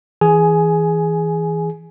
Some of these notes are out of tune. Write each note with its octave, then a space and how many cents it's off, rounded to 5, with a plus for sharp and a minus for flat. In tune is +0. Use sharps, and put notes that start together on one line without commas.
E3 -20 G#4 +0 G#5 +15